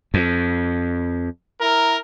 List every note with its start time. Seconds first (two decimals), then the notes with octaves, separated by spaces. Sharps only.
0.14 F2
1.61 E4 A#4